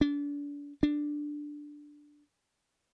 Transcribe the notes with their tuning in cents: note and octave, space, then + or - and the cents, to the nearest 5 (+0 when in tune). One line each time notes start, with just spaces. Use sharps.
D4 -35
D4 +5